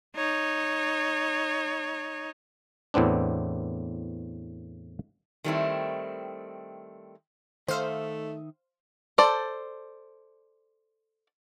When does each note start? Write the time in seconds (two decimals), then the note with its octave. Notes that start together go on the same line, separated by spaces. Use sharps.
0.16 D#4 C#5
2.94 E2 A2 B3 C4 D4
5.44 D#3 G3 A3 A#3 C4 E4
7.68 D#3 A3 D#4 C5 E5 F5
9.18 A4 C5 D5